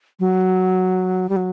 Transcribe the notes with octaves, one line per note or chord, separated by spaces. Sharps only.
F#3
G3
F#3